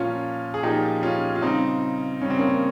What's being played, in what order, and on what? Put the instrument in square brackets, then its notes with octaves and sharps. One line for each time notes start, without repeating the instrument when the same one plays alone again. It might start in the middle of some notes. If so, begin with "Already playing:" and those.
Already playing: [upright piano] A#2 F3 C#4 F4
G#4
A#2 F3 D#4 G4
C#4 F4
F4
C#3 G3 C4 D#4
C#3 G3 C#4
C4
A#3 C#4